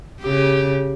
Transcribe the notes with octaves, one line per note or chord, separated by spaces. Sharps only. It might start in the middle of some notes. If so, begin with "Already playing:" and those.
C#3 G4